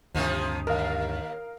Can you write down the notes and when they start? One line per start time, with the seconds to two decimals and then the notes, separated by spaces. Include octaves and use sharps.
0.15 D2 G2 C3 D#3 F3
0.67 D#2 A#4 F5